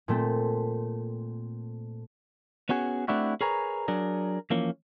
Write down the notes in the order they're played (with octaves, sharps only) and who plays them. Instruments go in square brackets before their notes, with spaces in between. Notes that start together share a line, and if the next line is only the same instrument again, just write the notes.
[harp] A#2 A3 C4 A4
[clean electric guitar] B3 C#4 F#4 G#4
A3 C4 D4 E4 F#4
G#4 A#4 B4 C#5 G#5 A#5
F#3 D4 G#4 A#4
E3 F3 A#3 C#4